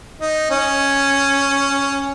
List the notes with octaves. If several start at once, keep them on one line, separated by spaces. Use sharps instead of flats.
D#4
C#4